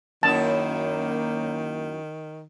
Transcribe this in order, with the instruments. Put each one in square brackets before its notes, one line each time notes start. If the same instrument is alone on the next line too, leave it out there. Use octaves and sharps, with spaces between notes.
[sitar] F#2 E4 [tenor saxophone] D#3 [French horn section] A#3 [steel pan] A5